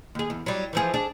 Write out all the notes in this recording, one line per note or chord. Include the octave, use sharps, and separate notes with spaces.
D#2 G#4
E2
F#3 G3
E3 F3 G#4
D4 G#4